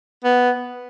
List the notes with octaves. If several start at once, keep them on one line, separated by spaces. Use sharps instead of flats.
B3